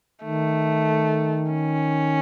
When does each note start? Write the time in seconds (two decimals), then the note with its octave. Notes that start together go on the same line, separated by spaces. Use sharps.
0.24 D#3 A3
1.50 C#4